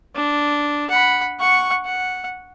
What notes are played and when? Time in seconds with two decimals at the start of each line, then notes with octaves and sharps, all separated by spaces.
0.15 D4
0.90 F#5 B5
1.39 F#5 C#6
1.85 F#5